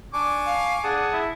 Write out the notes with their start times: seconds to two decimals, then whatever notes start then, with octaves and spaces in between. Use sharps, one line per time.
0.14 D4 G#5 C#6 D6
0.46 F5
0.83 D4 G#4 F#5 A5 D#6
1.13 E4